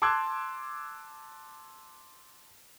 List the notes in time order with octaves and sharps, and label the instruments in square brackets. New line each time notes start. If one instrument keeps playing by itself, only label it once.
[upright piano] A5 C6 D6 E6 F#6 G#6